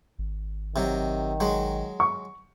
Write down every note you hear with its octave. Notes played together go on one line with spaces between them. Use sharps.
G#1
C3 D#3 F#3
F#3 G#3 F#4
C#6